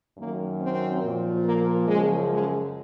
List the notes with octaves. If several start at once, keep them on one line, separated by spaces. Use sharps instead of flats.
F#2 D#3 F#3 A#3
C4
A#2 F3
A#3
F#2 C#3 F3 G#3
G#3